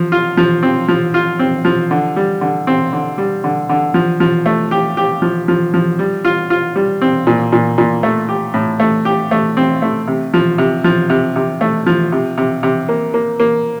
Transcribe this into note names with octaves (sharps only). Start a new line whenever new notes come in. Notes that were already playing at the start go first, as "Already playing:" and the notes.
Already playing: F3
F4
F3
C4
F3
F4
C4
F3
D3
G3
D3
C4
D3
G3
D3
D3
F3
F3
A3
G4
G4
F3
F3
F3
G3
F4
F4
G3
C4
A#2
A#2
A#2
A3
G4
A2
A3
G4
A3
C4
A3
C3
F3
C3
F3
C3
C3
A3
F3
C3
C3
C3
A#3
A#3
A#3